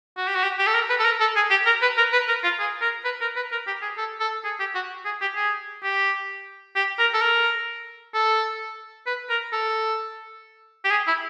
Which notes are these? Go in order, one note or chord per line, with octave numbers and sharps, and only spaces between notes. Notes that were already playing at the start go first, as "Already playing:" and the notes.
F#4
G4
F#4
G4
G4
A4
A#4
B4
A4
A#4
A4
G#4
G4
A#4
B4
A#4
B4
A#4
F4
G#4
A#4
B4
A#4
B4
A#4
G4
G#4
A4
A4
G#4
G4
F#4
G#4
G4
G#4
G4
G4
A#4
A4
A#4
A4
B4
A#4
A4
G4
G#4
E4